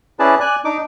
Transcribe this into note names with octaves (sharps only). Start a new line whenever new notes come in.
C#4 E4 G#4 B4 D5 A5
D5 G#5 F#6
D4 D#4 D6